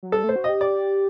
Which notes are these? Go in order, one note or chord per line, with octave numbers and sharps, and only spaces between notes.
F#3
G3 A4
A3 C5
F#4
G4 D#5
D5